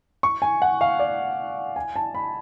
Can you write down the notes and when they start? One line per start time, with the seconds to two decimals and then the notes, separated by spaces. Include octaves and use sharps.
0.23 C#6
0.42 G#5
0.62 F#5
0.81 F5
0.99 D5
1.76 G#5
1.96 A5
2.15 B5